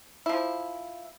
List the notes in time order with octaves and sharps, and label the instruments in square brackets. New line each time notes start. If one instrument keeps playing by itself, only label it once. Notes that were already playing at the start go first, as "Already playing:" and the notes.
[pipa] F3 E4